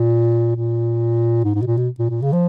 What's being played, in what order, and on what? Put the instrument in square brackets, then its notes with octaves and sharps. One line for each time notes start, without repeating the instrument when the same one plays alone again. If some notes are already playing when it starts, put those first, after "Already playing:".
Already playing: [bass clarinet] A#2
A#2
G#2
G#2
B2
A#2
B2
A#2
A#2
C#3
F3